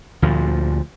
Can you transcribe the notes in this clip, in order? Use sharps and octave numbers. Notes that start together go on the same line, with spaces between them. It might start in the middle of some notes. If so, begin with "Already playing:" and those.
D2 A#2 F3